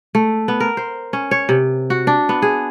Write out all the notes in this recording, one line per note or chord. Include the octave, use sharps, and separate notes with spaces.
A3
B3
A#4
C5
C#4
C#5
C3
F#4
D4
B3
G#4